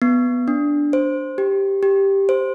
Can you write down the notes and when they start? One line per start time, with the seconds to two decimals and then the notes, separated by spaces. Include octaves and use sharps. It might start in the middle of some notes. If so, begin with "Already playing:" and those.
0.02 B3
0.48 D4
0.93 C5
1.38 G4
1.83 G4
2.29 C5